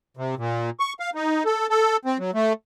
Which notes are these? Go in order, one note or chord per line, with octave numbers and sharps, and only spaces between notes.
C3
A#2
C#6
F5
D#4
A4
A4
C4
F#3
A3